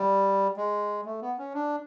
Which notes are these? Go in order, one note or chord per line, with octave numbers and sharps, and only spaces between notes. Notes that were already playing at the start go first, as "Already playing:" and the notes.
Already playing: G3
G#3
A3
B3
C#4
D4